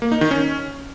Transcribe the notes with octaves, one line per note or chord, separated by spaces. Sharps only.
A#3
D#4
D#3
C#4